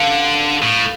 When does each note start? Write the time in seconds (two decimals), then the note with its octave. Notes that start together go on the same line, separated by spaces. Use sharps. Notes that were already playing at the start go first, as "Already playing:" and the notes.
Already playing: D3 F5
0.63 A2